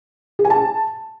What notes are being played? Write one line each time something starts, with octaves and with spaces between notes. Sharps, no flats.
G#4
G#5
A5